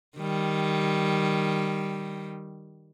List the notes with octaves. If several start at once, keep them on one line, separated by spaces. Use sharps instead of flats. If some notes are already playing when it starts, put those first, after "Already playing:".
D#3 G3